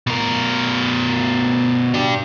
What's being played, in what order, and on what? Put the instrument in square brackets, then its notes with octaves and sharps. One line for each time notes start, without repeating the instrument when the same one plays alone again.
[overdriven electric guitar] B2 A#4
D4 G4